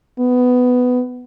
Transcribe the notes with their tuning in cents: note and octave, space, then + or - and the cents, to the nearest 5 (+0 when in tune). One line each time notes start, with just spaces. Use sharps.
B3 +10